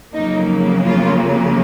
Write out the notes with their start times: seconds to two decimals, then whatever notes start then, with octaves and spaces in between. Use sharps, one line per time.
0.13 F2 C#3 F#3 A#3 D#4
0.84 F4